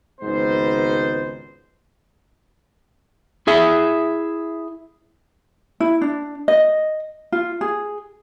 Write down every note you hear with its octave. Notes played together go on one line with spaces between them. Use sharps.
G#1 C#2 G#2 B3 C5
E4 G#4 E5
E4
D4
D#5
F4
G#4